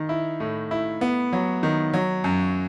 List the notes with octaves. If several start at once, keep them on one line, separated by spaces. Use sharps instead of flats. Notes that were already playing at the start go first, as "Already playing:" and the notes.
Already playing: D#3
E4
A2
E4
B3
F#3
D#3
F#3
F#2